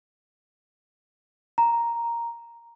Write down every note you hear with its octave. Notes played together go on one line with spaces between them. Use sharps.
A#5